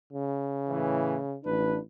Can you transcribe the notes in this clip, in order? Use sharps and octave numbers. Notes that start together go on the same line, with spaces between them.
C#3
A2 E3
A1 D4 B4